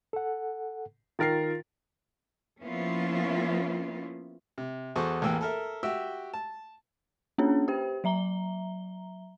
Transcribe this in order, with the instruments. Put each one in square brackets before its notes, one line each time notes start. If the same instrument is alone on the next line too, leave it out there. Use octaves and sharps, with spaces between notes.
[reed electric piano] A4 F#5
[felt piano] D#3 A#4 C7 [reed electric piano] F4 A6
[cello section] F3 A#3 B3 C#4 E4 F4
[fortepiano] C3
E2 F#4 A4 C5 C#6 D#6
A1 E2 E3 A#3 G5 E6
A4 A#4 E5
F#4 G4 E5 G5 E6
A5
[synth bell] A#3 C#4 D4 G#4 C#5
G4 C5 G5
F#3 E5 A#5 G7